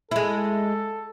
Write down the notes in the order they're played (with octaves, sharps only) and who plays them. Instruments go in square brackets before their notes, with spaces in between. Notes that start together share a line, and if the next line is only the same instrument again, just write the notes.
[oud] G#3 E4 [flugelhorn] A4